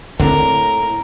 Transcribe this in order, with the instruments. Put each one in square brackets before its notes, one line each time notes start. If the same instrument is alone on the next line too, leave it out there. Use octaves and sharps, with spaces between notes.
[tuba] A2 [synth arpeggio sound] D3 [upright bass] C4 [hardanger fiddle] A#4